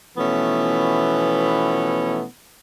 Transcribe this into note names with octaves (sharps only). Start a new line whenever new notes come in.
B2 E3 F3 A3 B3 C#4